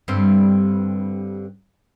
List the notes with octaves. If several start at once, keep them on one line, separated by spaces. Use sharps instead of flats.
G2 D3 C4